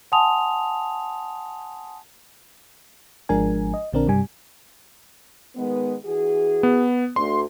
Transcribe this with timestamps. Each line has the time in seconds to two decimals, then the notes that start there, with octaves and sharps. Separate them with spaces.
0.12 F#5 G#5 A5 C6 D#6 F7
3.29 G#1 F3 G#3 D4 A#4 G#5
3.74 D#5
3.93 A#1 D3 C4 D4 A#4
4.07 G2 C3 G3 G#5
5.57 D#3 G#3 B3
6.06 E3 F#4 G#4
6.63 B3
7.16 D2 C6